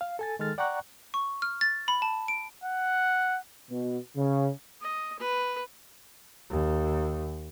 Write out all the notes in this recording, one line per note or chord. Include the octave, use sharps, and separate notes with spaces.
F5
A4 G#5 A6
D#3 G#3 A4 F6 A6
D5 F#5 G5 A#5 C#6 F#6
C#6
F6
A6
B5
A5
D7
F#5
B2
C#3
D#5
B4
D#2